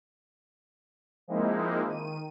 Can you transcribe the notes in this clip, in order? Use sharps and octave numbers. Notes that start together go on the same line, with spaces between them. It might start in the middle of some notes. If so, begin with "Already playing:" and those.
F3 G#3 A#3 C4 D#4 E4
D#3 D#7